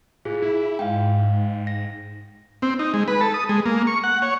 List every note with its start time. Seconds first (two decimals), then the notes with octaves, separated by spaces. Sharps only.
0.25 A2 F4 G#4
0.42 E4
0.79 G#2 F5 G5
1.67 A#6
2.62 C4
2.79 D#4
2.94 G#3
3.08 B4
3.21 A4
3.34 D#6
3.49 G#3
3.66 A#3
3.87 C#6
4.04 F#5
4.22 C#5